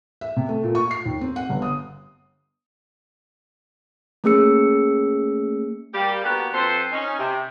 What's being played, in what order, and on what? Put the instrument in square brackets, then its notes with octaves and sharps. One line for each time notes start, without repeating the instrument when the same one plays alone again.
[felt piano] E5
C3
A3
A#2
C#6
C7
D#2
C4
F#5
G1
D#6
[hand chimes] A3 A#3 C#4 G#4 E6 C#7
[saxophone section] G3 A#3 G4
A#3 B3 D4 F#4 G4 A4
F2 A4 B4 C5
C#4 D#4
C3